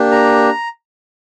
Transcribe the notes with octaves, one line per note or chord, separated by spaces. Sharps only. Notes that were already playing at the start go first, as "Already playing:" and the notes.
Already playing: A#3 D4 G4
A#5